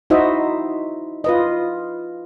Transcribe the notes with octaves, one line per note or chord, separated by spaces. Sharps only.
D#4 E4 F#4 C5 D#5 E5
F4 B4 D#5